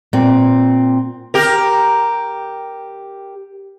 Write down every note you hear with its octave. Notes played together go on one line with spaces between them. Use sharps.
A#2 C4
G4 A#4